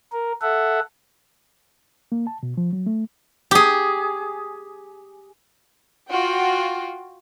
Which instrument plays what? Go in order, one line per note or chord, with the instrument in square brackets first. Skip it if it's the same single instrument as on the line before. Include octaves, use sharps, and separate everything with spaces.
[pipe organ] A#4
A4 E5 F#5
[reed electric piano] A#3
A5
B2
F3
F#3
A3
[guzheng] G4 G#4
[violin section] F4 F#4 G5